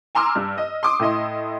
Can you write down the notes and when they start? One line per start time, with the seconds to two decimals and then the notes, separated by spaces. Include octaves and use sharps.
0.15 G#5 A#5 C6 D6 E6 F6
0.36 G2
0.58 D#5
0.83 C6 D6 D#6
1.00 A2 E4 D#5 C6